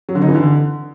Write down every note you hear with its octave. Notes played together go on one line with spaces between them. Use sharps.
F#3
D3
D#4
E3
D3